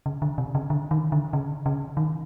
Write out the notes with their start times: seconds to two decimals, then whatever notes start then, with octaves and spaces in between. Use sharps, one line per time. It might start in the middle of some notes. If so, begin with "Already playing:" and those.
0.06 C#3
0.22 D3
0.38 C3
0.55 C#3
0.70 D3
0.91 D#3
1.12 D3
1.33 C#3
1.66 C#3
1.97 D#3